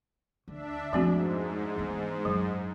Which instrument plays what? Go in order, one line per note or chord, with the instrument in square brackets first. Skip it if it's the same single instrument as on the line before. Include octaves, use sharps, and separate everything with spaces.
[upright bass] D2 [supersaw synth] D4 E5
[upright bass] F2 A3 [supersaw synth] G#2 [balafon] F3 C4 F#4
[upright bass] E3 B3
[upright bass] F#2 [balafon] F#3